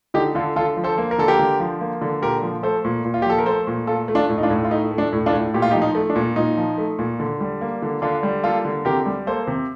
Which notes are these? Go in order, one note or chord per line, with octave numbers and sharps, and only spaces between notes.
D3 D#4 G4
D3 F4 A4
D3 F4 A4
F3
A4 C5
A#3
A#4
D3 A4
G4 A#4
D3
F3
A#3
D3
A#2 G4 A#4
F3
A3 A4 C5
A#2
A#2
F4
G4
F3 A4
A#4
A3 A4 C5
A#2
A3 F4 A4
A3
D4 F4
A2
D#4
D4 F4
A2
F4
A3 D#4
A3
D4
A2
D4 F4
A2
A#2 G4
F4
D#4 G4
F3
D#4
A3
D4
A#2
A#2 D#4
F3
A3
A#2
D3
G3
A#3
D3
D3 D4 F4
G3
A#3 F4 A4
D3
C3 G4 A#4
G3
A#3 A4 C5
C3